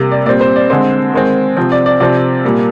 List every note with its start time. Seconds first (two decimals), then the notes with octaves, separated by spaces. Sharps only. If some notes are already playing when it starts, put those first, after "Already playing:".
Already playing: C3 G3 A#3
0.11 D5
0.26 A#2 G3 C4 D5
0.41 C5
0.56 D5
0.70 D3 G#3 C4 C5
1.14 D#3 G#3 C4
1.57 C3 F3 C4
1.72 D5
1.86 D5
2.00 C3 F3 C4 D5
2.44 A#2 G3 A#3